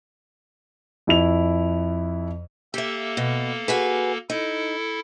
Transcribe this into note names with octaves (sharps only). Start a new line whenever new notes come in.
F2 E4 F7
A#3 G4 A4 E5
B2
F#4 G#4 B4
D#4 E4 A4